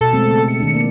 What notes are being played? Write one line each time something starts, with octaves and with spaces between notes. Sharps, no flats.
B2 A4
G#3 A3 C4
C#3
C#7
D#3 D4
A#3 D5